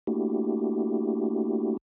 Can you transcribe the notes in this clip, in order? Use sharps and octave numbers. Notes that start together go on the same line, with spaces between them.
A3 A#3 D4 E4 F#4 G4